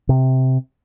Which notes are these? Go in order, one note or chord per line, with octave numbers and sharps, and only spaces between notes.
C3